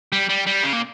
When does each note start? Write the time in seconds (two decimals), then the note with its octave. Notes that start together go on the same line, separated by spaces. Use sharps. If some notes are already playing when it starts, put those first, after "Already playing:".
0.12 G3
0.29 G3
0.47 G3
0.63 C#3
0.73 A#2